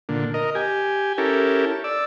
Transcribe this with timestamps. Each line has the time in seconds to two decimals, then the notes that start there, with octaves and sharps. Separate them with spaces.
0.09 A#2 D3
0.34 A#4 D#5
0.55 G4 G#5
1.18 C#4 E4 G4 A4 A#4
1.84 D5 E6